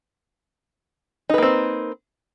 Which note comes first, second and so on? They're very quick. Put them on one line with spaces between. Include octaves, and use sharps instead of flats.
D#4 B4 A#3 C4